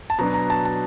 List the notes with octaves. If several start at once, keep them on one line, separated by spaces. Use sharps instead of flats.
A5
B2 F#3 B3 D4 A#5
A#5
A5
A5